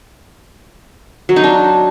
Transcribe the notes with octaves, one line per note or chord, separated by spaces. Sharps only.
F#3
D#4
D4